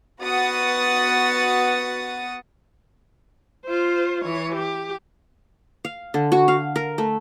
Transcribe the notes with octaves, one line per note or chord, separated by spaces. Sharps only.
B3 F#4 F#5 D#6 A6
F4 C5
E3 C#5
G4
F5
D3
F#4
F5
A#4
A3